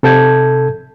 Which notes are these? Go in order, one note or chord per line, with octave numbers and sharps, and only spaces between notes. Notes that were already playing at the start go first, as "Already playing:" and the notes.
C3 A4 A5 G6 G#6